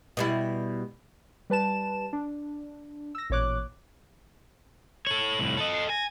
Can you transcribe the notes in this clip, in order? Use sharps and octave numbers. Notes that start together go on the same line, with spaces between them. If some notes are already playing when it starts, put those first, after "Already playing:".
B2 G3 E4
G3 B4 A5 E7
D4
E6 A#6
A1 A#2 C#5 D6 F#6
A4 C#5 F#7
C2 A2
A4 D#5
C7
G#5 A#6